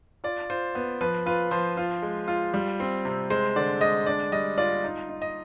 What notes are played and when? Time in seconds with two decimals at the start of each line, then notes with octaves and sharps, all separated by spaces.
0.24 F4 D5
0.50 F4 C5
0.75 B3
1.01 F3 B4
1.26 F4 B4
1.51 F3 C5
1.77 F4
2.02 G#3
2.28 F4
2.54 G3
2.80 C4
3.05 C3
3.30 G#3 C5
3.56 D3 D5
3.81 G#3 D#5
4.06 D4 D5
4.32 G3 D#5
4.58 F4 D5
4.84 D#4
5.09 D#4
5.22 D#5